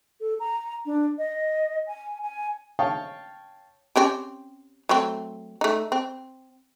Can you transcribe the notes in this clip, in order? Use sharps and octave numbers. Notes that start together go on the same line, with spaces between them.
A4
A#5
D4
D#5
G#5
G#5
C#5 F5 G5 A5 C#6 D#6
C4 C#4 G4
F#3 A3 C4
A3 D#4
C4